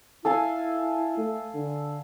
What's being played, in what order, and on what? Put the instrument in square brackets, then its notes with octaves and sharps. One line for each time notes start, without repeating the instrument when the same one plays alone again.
[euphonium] E4 [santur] A4 F5 G#5
[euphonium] A3
D3